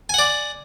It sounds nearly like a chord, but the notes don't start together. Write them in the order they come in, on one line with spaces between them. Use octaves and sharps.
G#5 F#5 D5